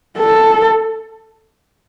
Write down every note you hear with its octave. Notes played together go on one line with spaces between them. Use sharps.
A4